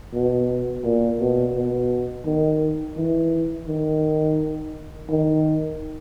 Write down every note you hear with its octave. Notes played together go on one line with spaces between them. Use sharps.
B2
A#2
B2
B2
D#3
E3
D#3
D#3